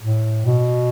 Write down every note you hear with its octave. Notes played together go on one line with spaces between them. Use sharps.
A2
B2